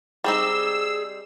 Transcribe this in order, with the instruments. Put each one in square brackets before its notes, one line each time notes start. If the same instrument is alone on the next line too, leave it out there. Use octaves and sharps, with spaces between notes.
[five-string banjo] G3 C4 D#4 [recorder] G#4 [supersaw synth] E6